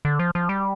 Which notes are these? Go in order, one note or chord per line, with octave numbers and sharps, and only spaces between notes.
D3
F3
F3
G3